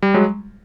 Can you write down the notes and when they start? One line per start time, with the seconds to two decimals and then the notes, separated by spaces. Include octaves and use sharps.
0.02 G3
0.14 F#3 G#3